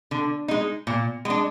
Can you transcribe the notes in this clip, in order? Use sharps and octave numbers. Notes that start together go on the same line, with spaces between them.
D3
G#3 D#4
A#2
G#3 D4